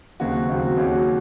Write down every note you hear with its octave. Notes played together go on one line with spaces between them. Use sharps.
D#2 C#3 F#3 C4 F#4
D#2 C#3 F#3 C4 F#4
D#2 C#3 F#3 C#4 F#4